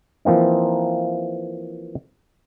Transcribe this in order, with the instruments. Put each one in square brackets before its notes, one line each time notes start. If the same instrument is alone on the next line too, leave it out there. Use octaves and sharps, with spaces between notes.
[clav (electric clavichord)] E3 F3 A#3 C4 D#4